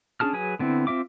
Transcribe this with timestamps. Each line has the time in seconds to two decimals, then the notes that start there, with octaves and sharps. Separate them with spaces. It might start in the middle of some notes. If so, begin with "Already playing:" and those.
0.20 C#4 D4 G#4 A5 F6
0.33 F#3 G#4 B4 G#5
0.59 D3 B3 C4 E4
0.87 C4 F4 E5 D6